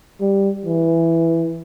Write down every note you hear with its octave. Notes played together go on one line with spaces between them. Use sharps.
G3
E3